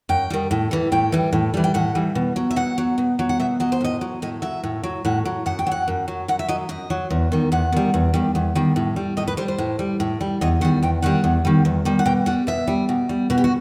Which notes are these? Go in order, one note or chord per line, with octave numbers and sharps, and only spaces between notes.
F#2 G5
D#3 G3
A2
E3 G3
A2 G5
E3 G3
A2
E3 G3
G5
A2 F#5
E3 G3
B2
F#3
E5
B2 F#5
F#3
B2
F#3
F#5
B2 E5
F#3 D#5
C5
A2 D#5
F#3
A2 D#5
F#3 E5
A2
F#3
A2 F#5
F#3
F#2 F#5
G5
F#3 F#5
F#2
F#3
F#2 F#5
E5
F#3 D#5
F#2 D#5
F#3
E2
D#3 G3
E2 F#5
D#3 G3
E2
D#3 G3
E2
D#3 G3
A2
G3
A2 D#5
B4
G3 C5
C5
A2
G3
A2
G3
E2 D#5
D#3 G3 F#5
E2 G5
D#3 G3 F#5
E2
D#3 G3
E2
D#3 G3
F#5
B2 G5
G3 F#5
B2 E5
G3
B2
G3
B2 F#4
G4
F#4